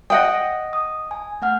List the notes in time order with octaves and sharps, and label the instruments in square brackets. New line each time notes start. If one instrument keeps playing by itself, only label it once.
[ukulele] D#5 F#5 G5 [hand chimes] D#6
[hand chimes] D#6
G#5
A3 F#5 F6